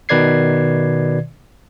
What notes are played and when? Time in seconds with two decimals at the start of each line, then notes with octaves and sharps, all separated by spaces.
0.09 B2 D#3 B4 D5 G#6 C7